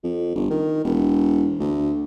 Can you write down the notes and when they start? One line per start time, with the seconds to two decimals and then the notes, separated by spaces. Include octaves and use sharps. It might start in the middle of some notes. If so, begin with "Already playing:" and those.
0.04 F2
0.35 G1
0.50 D#3
0.85 E1
1.60 D2